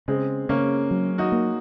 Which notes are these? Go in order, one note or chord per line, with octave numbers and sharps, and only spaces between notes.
C#3 G#3 C4
C#3 A#3 C#4
F#3
D#4 F#4
A#3